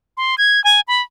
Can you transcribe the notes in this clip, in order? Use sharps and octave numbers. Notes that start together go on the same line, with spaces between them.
C6
G#6
G#5
B5